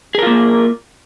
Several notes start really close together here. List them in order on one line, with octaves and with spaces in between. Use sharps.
G#4 A#4 F4 A#3